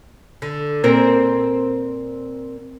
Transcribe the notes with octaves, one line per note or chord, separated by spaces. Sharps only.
D3
A#2 C4 A#4